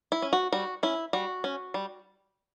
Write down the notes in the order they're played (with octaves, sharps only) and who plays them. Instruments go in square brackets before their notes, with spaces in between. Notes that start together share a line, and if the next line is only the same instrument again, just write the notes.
[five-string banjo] E4
C#4
F#4
G3 F#4
C#4 E4
G3 F#4
C#4
G3